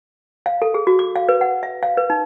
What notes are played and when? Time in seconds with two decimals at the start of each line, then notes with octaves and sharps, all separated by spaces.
0.46 F5
0.62 A4
0.74 G#4
0.87 F#4
0.99 D6
1.16 F5
1.29 B4
1.41 F#5
1.63 E5
1.83 F5
1.97 B4
2.10 D#4